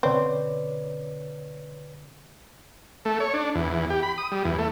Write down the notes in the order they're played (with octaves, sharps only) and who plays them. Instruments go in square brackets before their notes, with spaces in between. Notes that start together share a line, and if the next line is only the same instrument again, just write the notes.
[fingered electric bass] B2 D3 C#4 [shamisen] C4 [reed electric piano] B4 C#5 D5
[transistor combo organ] A3
C#5
D4
E2
E2
G4
B5
D#6
G3
E2
A3